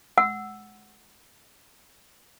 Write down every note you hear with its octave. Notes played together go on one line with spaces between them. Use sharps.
F#5 E6